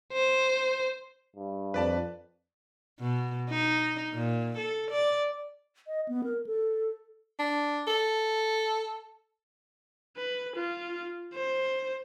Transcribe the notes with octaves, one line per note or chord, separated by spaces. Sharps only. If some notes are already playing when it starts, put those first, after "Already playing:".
C5
G2
F2 B4 D5 A5
B2
D#4
A#2
A4
D5
D#5
B3
A#4
A4
D4
A4
B4
F4
C5